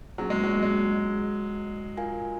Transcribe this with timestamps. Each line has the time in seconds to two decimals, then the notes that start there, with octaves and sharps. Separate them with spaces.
0.18 F#3 A#3 C#4 G#4
0.30 G#3
0.43 F#3
0.63 G#3
1.97 F4 A#4 F5 G#5